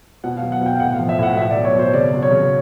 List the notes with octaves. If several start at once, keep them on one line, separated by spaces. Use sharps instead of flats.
B2 F#5
F5
F#3
F#5
B2 G5
F5
A2 F#5
F5
F3
E5
A2 F#5
B2 E5
D5
F#3
C#5
B2 C5
C#3 D5
F#3
C#5
C#3